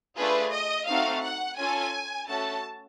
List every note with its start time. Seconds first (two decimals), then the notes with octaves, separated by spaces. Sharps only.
0.17 A3 D4 F4 G#4 B4
0.52 D#5
0.87 A3 C4 D#4 F#4 F5
1.23 F#5
1.57 C#4 F4 A4 G#5
2.28 A3 C#4 F#4 A4 A5